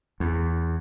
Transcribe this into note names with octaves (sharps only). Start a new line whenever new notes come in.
E2